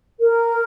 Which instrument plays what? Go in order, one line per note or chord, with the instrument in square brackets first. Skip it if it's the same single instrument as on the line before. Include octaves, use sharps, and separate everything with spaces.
[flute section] A#4